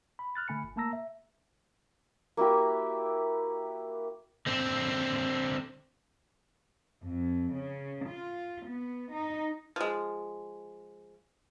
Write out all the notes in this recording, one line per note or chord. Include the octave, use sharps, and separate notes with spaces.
B5
F6 F#6 A6
D3 A3 G#5 B5 C#7
G1
A3 A#3 A5 A#5 E6 A#6
E5
A#3 E4 F#4 G4
D3 C4
F2
C#3
F4
B3
D#4
F3 G#3